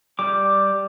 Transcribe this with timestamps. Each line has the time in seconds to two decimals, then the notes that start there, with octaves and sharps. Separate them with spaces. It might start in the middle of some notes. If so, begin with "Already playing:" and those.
0.19 G3 D6